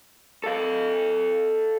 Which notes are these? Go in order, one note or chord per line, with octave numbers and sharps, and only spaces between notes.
A4 F5